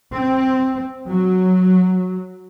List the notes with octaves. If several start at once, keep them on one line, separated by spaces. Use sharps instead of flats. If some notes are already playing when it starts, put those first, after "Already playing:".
C4
F#3